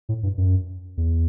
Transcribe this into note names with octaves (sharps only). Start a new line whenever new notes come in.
A2
G2
F#2
E2